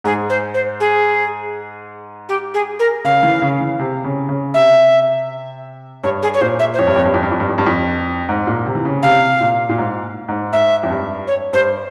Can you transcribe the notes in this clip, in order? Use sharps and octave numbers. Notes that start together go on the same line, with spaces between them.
G#2 G#4
C5
C5
G#4
G4
G#4
A#4
C#3 F5
E3
C#3
E3
C3
C#3
C#3
C3 E5
G2 C#5
G#4
C#5
A#2 C5
E5
C5
F2 C#5
G2
F2
G2
F2
G2
F2
G2
F2
G2
F2
G#2
A#2
C3
E3
C#3
C3 F5
A#2
A#2
G#2
G#2
G#2 E5
F2
G2
C#5
G2 C5